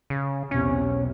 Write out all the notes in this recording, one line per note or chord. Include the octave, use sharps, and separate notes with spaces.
C#3
B1 E2 C3 C#4